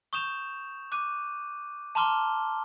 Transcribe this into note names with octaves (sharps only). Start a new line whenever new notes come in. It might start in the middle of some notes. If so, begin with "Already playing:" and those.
C#6 D#6 G6 E7 F7
D6 F#6 D#7
A5 A#5 C6 D6 F6 G7